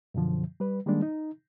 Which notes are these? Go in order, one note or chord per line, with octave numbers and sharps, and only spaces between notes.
F#2 B2 D3 F3
G3 B4
D#3 G3 G#3 A#3 D4
D#4